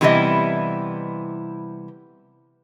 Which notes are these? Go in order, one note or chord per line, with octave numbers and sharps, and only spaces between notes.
C3 E3 G3 B3 E4 D#5